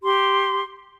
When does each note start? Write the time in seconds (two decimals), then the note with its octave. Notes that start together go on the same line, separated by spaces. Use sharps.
0.04 G4 C6